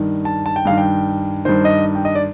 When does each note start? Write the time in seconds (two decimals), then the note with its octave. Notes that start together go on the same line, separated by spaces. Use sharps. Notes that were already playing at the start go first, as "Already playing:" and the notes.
Already playing: G2 D#3
0.25 A5
0.46 A5
0.56 G5
0.65 G2 D#3 F5
0.78 G5
1.45 G2 D#3 C5
1.65 D#5
1.95 G5
2.05 D#5
2.15 D5